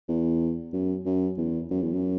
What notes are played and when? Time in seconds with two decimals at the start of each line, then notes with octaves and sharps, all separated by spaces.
0.08 E2
0.73 F#2
1.05 F#2
1.37 E2
1.71 F#2
1.82 E2
1.93 F#2